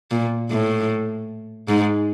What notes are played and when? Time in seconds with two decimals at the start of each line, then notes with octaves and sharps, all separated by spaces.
0.11 A#2
0.50 A2
1.68 G#2